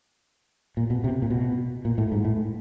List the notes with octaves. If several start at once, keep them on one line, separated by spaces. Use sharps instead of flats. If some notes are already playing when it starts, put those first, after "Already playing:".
A#2
B2
C3
A#2
B2
A#2
A2
G#2
A2